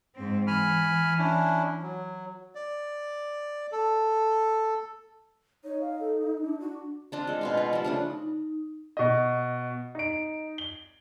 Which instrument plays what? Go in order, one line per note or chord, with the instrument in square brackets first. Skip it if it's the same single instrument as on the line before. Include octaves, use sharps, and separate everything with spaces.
[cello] G#2 C4
[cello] E3 [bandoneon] G#5 B5 F6
[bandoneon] C#4 D4 E4
F#3
D5
A4
[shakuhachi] D#4 [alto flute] C#5
[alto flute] F5
A4
D4
[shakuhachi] F#4
[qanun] C4 D4 F4
G#3 A4
B2 F4 F5
F4
F3 G3
C#3 A3 D4
[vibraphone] D#4
[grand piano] B2 D#5
D#4 D7
G7